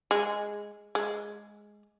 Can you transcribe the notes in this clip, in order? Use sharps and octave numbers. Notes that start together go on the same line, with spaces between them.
G#3
G#3